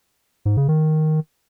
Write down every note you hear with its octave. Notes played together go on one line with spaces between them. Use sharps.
G#2
C#3
D#3